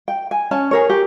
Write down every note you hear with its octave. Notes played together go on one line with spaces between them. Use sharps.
G5
G#5
C#4 C#5 A5
G#4 A#4 C#5
G4